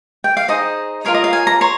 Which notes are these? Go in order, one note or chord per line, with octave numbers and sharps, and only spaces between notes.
G5
F5
D#4 G#4 C5 D#5
F4 A#4 C#5 F5
D#5
F5
G#5
A#5
C#5 C6